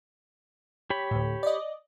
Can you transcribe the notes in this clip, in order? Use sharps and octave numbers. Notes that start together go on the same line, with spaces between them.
G4 C#5 B5
D2 A2
D5 D#5